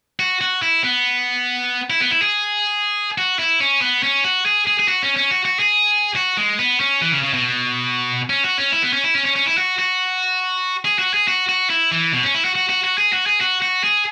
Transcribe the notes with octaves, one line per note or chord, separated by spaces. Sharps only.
F#4
F#4
E4
B3
E4
B3
E4
G#4
F#4
E4
C#4
B3
C#4
F#4
G#4
G#4
G#4
F#4
C#4
C#4
F#4
F#4
G#4
F#4
G#3
B3
C#4
E3
C#3
C#3
B2
C#4
F#4
C#4
E4
B3
C#4
E4
C#4
C#4
C#4
E4
F#4
F#4
G#4
F#4
G#4
F#4
F#4
E4
E3
B2
C#4
E4
F#4
F#4
F#4
F#4
G#4
F#4
G#4
F#4
F#4
G#4